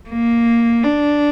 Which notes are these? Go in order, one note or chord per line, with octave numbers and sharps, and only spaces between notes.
A#3
D4